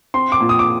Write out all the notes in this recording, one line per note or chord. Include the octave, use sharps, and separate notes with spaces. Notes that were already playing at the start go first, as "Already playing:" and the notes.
C4 C6
D6
A#2
D#6
D6